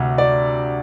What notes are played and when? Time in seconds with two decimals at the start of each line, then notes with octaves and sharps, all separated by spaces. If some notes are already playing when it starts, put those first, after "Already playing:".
Already playing: D2 C3
0.18 D5